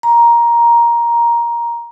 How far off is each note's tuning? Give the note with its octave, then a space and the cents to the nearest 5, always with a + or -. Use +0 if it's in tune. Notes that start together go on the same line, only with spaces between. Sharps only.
A#5 +10